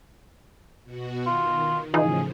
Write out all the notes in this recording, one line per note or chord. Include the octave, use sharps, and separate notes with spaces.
B2 F#4
D#3 F4
A2 C#3 E3 F3 D#4 F4 G#4